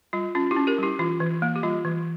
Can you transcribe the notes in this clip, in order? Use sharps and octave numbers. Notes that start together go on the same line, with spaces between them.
G3 F4
C#4 F4
E4 G4
C#4
G4 A#4
G3 E4 G4
E3 F4
E3
A#3
G4
G3 F4
E3